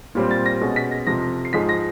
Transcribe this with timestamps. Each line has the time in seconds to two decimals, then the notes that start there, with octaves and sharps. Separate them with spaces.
0.15 A#2 G3 C4
0.31 A6
0.46 A#6
0.61 B2 G#3 C#4
0.76 B6
0.91 A#6
1.07 F2 C3 F3 A#6
1.45 C7
1.53 G#2 F3 G#3 B6
1.69 A#6